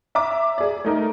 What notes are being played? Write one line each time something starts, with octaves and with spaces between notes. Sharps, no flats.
E5 A#5 D6
G#4 D5
A3 D#4 A#4